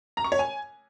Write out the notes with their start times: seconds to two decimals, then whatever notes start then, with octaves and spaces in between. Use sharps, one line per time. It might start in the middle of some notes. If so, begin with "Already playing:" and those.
0.17 A#5
0.24 C#6
0.32 C#5
0.39 G#5